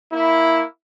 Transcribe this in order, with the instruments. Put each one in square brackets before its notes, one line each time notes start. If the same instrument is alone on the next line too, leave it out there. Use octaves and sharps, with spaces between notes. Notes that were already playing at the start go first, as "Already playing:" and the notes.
[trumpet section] A#3 E4